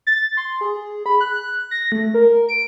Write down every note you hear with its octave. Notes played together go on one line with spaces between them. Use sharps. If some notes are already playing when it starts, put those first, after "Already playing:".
A6
C6
G#4
B5
F#6
A#6
A3
A#4
D7